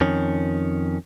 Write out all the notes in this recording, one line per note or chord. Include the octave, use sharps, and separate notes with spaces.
F2 D#3 C#4